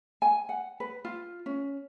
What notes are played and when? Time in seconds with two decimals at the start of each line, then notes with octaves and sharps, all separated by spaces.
0.22 G#5
0.49 F#5
0.80 B4
1.05 F4
1.46 C#4